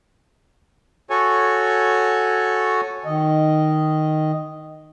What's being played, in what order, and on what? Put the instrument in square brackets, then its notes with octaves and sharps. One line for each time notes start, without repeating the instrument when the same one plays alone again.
[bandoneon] F#4 A4 C#5 G#5
[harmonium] D#3 D#5